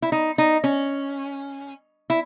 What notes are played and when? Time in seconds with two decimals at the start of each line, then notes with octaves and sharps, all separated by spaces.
0.02 E4
0.12 D#4
0.38 D#4
0.64 C#4
2.10 E4